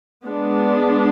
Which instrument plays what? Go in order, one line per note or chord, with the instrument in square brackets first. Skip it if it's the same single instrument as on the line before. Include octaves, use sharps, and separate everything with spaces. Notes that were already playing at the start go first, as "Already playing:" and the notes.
[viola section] G#3 B3 D4